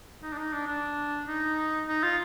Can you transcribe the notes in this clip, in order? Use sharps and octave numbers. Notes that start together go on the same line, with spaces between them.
D#4
D4
D#4
D4
D4
D#4
D#4
F4